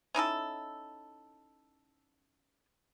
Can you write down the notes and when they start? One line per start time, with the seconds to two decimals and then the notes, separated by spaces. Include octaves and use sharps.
0.15 C#4 D#4 E4 A4